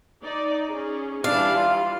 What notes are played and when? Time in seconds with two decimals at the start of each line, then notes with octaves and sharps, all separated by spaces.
0.22 D#4 D5
0.70 C#4 G#4
1.24 E3 G3 D4 F5
1.56 F4